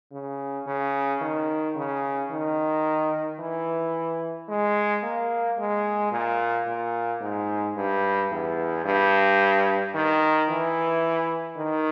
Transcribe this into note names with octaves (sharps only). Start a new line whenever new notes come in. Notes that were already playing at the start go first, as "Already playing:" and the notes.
C#3
C#3
D#3
C#3
D#3
E3
G#3
A#3
G#3
A#2
A#2
G#2
G2
E2
G2
D#3
E3
D#3